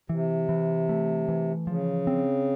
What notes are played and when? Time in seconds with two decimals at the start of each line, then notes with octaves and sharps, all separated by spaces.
0.09 C3 E3
0.49 E3
0.89 A3
1.28 E3
1.67 C#3 F3
2.07 C4